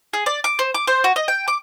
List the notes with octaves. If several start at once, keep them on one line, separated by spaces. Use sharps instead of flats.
G#4
D5
D6
C5
D6
C5
F#4
D#5
G5
D6